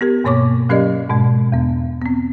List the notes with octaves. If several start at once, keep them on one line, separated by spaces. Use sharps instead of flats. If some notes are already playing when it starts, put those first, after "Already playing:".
B3 G4 A#4
G2 B2 A#3 C#5 C#6 D6
F#3 C#4 G4 A#4 D5 D#5
G#2 B2 G#3
E2 B3
B3 C4